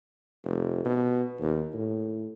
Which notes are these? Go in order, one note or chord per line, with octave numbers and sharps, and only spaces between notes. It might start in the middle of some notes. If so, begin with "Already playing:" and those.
F1
B2
D#2
A2